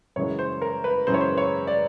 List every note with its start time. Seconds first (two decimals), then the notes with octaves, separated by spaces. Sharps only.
0.16 F#2 C#3 E3 G#3 C#5
0.39 C5
0.62 A#4
0.84 B4
1.07 F#2 C#3 E3 G#3 C5
1.14 C#5
1.21 C5
1.38 C#5
1.67 D5